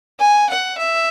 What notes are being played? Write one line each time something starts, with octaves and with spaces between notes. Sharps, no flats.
G#5
F#5
E5